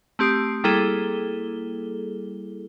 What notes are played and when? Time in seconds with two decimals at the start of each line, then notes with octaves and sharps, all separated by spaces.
0.19 A3 C4 G4 D#6 C7 D7
0.64 G3 A#3 E4 G#4 A4 G7